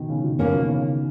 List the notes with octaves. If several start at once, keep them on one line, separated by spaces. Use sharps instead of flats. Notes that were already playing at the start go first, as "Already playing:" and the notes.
Already playing: B2 D#3
C#3
C#3
B2
C#3 E3 A#3 C#4
B2 D#3
C#3 E3